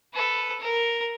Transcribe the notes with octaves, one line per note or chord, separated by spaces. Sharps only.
A4 B4
A#4